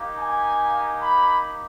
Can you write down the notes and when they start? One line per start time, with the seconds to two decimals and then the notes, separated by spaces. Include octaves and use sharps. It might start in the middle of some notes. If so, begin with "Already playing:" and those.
Already playing: A#3 D#4 G4
0.18 G#5
1.02 B5